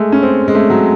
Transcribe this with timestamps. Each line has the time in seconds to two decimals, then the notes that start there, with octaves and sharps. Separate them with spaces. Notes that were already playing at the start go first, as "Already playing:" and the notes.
Already playing: G#3 A3
0.12 C#4
0.23 C4
0.48 G#3
0.55 A3
0.70 F#3